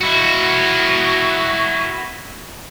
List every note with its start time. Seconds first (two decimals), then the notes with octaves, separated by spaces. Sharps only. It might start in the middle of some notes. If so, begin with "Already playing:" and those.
0.01 E4 F#4